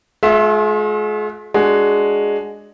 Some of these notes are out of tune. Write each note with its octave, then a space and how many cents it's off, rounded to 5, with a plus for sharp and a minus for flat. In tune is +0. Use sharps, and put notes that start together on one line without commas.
G#3 +40 F4 +45 E5 +0
G#3 +0 D4 +0 F#4 +0